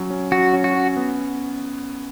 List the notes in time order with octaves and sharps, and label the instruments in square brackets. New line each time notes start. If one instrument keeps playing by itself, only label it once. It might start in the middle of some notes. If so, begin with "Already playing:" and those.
Already playing: [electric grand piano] F#3 C#4
C#4
[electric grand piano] F#3 [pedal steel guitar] F#4
[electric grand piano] C#4
[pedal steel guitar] F#4
[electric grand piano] C#4
B3